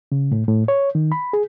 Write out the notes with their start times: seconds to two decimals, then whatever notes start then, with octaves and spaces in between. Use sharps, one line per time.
0.12 C#3
0.32 A2
0.48 A2
0.68 C#5
0.95 D#3
1.12 B5
1.33 G#4